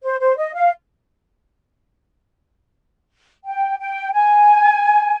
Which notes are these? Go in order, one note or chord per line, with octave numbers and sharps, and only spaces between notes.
C5
C5
D#5
F5
G5
G5
G#5